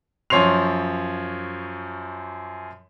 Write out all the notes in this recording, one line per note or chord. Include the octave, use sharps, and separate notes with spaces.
F#2 F3 C#5 C6 C7 F7